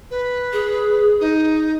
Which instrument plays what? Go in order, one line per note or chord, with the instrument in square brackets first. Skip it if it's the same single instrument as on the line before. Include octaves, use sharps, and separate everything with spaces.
[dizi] B4
[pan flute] G#4
[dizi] D#4